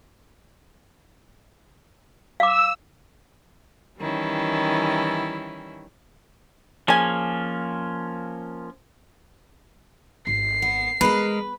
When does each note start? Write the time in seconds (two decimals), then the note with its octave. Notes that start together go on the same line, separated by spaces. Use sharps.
2.40 F5 D6 E6
3.98 D#3 E3 G3 C#4 E4
6.88 F3 A#3 C#4 G#4 G#5
10.27 G#1 C7
10.62 B3
11.01 G#3 B3 A#4 B4